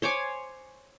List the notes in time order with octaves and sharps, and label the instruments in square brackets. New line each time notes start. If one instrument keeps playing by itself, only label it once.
[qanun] C5 C#5 G#5 D6